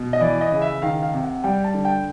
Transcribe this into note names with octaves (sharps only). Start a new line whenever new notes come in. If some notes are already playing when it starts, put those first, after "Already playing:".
Already playing: B2
D#5
E3 D5
D#5
C#3
E5
D#3 F5
F5
C3
F#5
G3 G5
A5
D3
G5